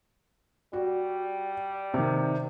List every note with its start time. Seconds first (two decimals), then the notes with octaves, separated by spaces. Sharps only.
0.73 G3 F#4
1.94 C3 D#3